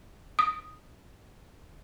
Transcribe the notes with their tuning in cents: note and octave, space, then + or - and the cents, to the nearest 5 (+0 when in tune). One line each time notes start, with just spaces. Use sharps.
D#6 +0